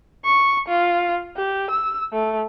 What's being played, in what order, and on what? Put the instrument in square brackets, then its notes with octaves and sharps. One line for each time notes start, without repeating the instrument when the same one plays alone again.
[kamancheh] C#6
F4
G4
E6
A3